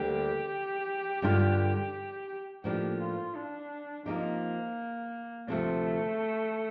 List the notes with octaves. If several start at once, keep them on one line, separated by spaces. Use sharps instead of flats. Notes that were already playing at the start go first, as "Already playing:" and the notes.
Already playing: D2 D3 G3 A#3 G4
G2 D3 G3 D4 F4
A2 F3 A#3 D4 G4
F4
D4
F3 A#3 C4 D#4 G4
D2 C3 F3 A3 C4